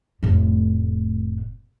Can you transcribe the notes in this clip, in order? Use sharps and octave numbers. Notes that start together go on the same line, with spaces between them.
F1 A2